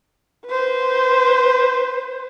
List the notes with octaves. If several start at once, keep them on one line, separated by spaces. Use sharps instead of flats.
B4 C5